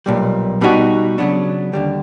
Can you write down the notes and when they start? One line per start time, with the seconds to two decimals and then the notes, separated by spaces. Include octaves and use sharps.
0.06 B1 A#2 G3
0.61 B2 G3 B3 D#4 F#4
1.18 C#3 F#3 B3 D4
1.73 D#2 D3 G3